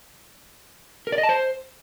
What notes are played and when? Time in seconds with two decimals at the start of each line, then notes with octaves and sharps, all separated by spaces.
1.07 A#4
1.12 D5
1.18 D#5
1.23 A5
1.29 C5